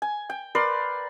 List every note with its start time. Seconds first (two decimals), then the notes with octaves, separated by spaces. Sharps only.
0.02 G#5
0.30 G5
0.55 A#4 B4 D5 C6